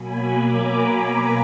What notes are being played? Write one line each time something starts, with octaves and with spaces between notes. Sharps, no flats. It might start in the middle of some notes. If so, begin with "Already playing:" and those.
Already playing: B2 F#3 A#3 G#5 B5
A#5 D6